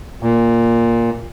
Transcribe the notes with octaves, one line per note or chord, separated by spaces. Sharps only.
A#2